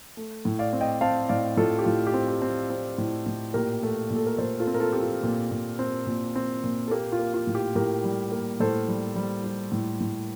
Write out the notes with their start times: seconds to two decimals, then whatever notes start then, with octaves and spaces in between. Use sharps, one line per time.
0.17 A3
0.45 A2
0.59 D5 F5
0.73 C4
0.81 D#5 G5
1.01 C4 F5 A5
1.29 A2 D5 F5
1.57 A2 F4 A4
1.79 G4
1.85 A2 F4
2.07 G4
2.14 C4
2.28 G4
2.42 C4
2.70 C4
2.98 A2
3.26 A2
3.54 A#2 G4 A#4
3.83 A3
4.10 A#2
4.16 A4
4.26 A#4
4.38 A#2 A4 C5
4.59 F4 A4
4.67 C4
4.74 A#4
4.80 F4 A4
4.93 C4 G4
5.01 F4
5.23 A#2
5.51 A#2
5.79 C4
6.07 A#2
6.36 C4
6.64 A#2
6.88 A4
6.91 A#3 G4
7.12 F4
7.19 A#3
7.34 F4
7.47 A2
7.55 G4
7.76 A2 G4 A#4
8.04 G3
8.32 A#3
8.60 A2 A4 C5
8.88 G3
9.16 G3
9.44 G3
9.72 A2
10.01 A2